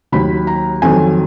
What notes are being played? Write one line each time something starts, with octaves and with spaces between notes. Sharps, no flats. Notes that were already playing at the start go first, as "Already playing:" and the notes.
D#2 D#3 F#3 B5
A#5
F2 D#3 F#3 G#5